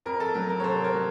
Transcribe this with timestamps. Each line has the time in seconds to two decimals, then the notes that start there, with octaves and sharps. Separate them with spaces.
0.06 F2 A#4
0.20 A4
0.34 F#3 A#4
0.49 A#4
0.60 C#5
0.64 C3 A4 C5
0.84 A#4 C#5
0.94 F#3